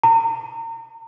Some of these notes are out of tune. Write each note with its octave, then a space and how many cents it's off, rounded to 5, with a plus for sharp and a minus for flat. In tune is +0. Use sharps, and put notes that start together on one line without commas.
A#5 -35